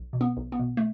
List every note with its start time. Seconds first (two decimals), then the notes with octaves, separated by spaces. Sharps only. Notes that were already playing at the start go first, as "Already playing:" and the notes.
Already playing: B1
0.13 B2
0.21 B3
0.37 B1
0.52 B3
0.59 B2
0.77 A3